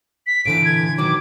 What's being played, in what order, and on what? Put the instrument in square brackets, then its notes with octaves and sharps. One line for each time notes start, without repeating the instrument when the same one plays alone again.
[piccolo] B6
[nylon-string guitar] A#2 D3 E3 [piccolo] D7
[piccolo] G#6
[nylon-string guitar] B2 D#3 F#3 [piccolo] D6